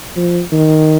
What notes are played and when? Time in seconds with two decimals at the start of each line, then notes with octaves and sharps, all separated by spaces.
0.16 F3
0.52 D#3